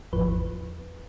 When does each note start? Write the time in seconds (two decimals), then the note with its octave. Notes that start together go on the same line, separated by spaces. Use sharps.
0.13 G#1 E2 F3 B4